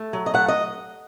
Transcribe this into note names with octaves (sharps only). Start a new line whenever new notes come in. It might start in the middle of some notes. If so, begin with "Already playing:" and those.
Already playing: A3
F#3
D#5
A3 F#5
D#5